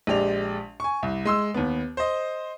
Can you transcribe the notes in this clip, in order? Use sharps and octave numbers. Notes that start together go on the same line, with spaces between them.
A#1 G#3 G4 D5 F7
G#5 C#6
C2
G#3 C6 E6
D#2 B3
C5 D#5